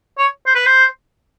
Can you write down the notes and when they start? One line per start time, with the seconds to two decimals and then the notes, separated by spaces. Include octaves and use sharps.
0.18 C#5
0.46 C5
0.55 B4
0.66 C5